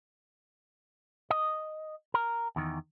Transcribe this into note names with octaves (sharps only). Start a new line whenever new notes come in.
D#5
A#4
E2 D#3